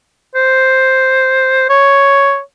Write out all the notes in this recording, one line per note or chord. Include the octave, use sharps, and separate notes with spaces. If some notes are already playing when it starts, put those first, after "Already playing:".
C5
C#5